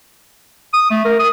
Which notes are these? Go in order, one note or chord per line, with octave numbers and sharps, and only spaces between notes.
D#6
A3
A#4
D#6